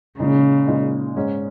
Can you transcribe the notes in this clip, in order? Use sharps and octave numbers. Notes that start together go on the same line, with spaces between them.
A#2 C#3 G#3 D#4
A#2 G#3 D#4
G#2 G#3 C#4